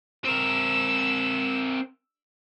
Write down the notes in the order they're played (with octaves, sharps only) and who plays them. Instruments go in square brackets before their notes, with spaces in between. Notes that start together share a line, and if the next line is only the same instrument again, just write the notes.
[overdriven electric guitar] C4 A#4 [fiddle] E6